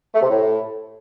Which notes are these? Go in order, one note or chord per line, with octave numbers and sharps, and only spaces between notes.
A3
C3
A2